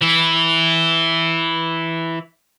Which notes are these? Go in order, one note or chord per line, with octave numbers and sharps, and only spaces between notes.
E3 E4